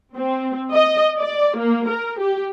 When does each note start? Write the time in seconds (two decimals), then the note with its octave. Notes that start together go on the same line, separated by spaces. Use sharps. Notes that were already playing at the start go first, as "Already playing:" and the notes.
0.16 C4
0.72 D#5
1.19 D5
1.57 A#3
1.89 A#4
2.20 G4